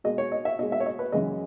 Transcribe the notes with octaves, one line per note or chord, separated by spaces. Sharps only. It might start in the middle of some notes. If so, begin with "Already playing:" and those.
B2 G#3 D#5
C#5
D#5
E5
B2 G#3 D#5
E5
C#5
D#5
B4
F#2 C#3 E3 G#3 D#5